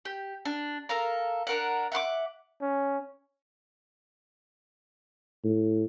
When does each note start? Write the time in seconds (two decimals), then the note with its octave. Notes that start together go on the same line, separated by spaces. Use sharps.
0.05 G4
0.45 D4
0.89 A4 A#4 F5 A#5
1.47 D4 A#4 F#5
1.92 E5 F#5 C6 D6
2.61 C#4
5.44 A2